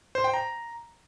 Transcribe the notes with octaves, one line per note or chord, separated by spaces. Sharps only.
C5
G5
A#5